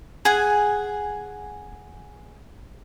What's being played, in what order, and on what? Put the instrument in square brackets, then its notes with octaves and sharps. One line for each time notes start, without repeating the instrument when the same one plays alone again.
[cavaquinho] G#4 F#5 G#5